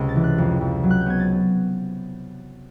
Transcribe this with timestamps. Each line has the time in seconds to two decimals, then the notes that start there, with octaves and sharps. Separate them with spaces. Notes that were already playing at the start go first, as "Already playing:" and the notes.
Already playing: C#2 C3
0.09 A6
0.16 E3
0.24 F#6
0.38 F2
0.61 F2
0.83 F#3
0.90 F#6
1.00 G6
1.06 B3 G#6
1.19 A6